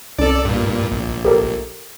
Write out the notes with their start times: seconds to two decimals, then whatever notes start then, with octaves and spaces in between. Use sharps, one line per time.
0.19 C2 C#4 A4 D5
0.45 G2 A#2
0.92 A#1
1.25 G4 A4 A#4